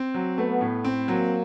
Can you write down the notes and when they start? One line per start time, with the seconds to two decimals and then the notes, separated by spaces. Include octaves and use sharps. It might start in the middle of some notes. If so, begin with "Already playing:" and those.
Already playing: C4
0.14 F#3
0.38 A3 B3
0.61 A2
0.84 C4
1.08 F#3 A#3